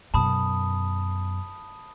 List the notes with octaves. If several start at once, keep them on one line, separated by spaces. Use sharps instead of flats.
F#2 B2 A5 B5 D#6